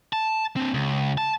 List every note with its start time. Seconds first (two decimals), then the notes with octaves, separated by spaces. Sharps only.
0.13 A5
0.56 C4 D4
0.74 C#2
1.18 A5